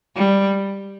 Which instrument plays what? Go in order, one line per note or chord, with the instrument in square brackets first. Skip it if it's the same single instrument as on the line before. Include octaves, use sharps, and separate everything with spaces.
[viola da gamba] G3